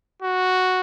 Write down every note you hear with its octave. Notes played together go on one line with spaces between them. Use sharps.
F#4